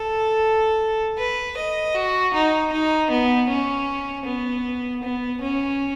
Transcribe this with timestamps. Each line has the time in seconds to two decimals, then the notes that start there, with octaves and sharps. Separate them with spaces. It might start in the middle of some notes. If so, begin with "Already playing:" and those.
Already playing: A4
1.18 B4
1.57 D#5
1.94 F#4
2.33 D#4
2.72 D#4
3.10 B3
3.49 C#4
4.25 B3
5.02 B3
5.41 C#4